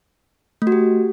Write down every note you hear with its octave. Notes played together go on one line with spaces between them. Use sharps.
A3
F#4
G4